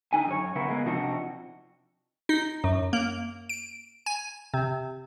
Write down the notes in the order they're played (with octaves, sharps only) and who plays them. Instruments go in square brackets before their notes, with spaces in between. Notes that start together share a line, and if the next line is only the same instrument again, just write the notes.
[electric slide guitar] D3 D#4 G#5
F#2 G4 C#5
C#3 B3 E4 A#4
G#3 A#3 B3
C3 F3 D4 D#4 F#4
[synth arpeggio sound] D#4
F#2
A#3
D7
G#5
C3